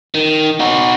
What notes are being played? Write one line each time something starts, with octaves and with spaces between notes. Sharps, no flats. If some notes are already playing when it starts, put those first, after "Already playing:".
D#3
D#4 F#4